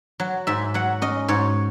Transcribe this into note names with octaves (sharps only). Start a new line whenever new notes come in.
F#3
G#2 E5
F#3 F#5
C#4 D#5
G#2 C#5